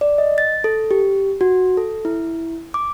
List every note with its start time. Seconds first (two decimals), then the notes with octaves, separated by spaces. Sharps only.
0.01 D5
0.18 D#5
0.38 A6
0.64 A4
0.91 G4
1.41 F#4
1.77 A4
2.05 E4
2.74 D6